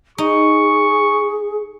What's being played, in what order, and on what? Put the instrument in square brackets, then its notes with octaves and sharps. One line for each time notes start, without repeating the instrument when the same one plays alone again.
[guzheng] D#4 [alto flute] G#4 [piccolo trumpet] C#6